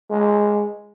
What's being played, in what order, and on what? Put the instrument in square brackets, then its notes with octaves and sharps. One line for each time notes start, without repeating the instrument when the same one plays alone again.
[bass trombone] G#3